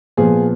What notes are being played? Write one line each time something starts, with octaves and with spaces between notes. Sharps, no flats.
A#2 F3 B3 F4 G#4